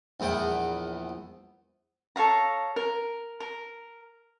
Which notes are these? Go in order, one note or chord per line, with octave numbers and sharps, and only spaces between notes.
A#1 E2 B3 G5
A4 C#5 F5 A#5
A#4
A#4